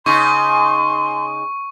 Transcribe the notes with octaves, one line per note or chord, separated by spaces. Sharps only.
C#3 D#4 C6 C#6